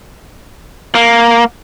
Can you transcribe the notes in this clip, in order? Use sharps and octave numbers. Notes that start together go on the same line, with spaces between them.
A#3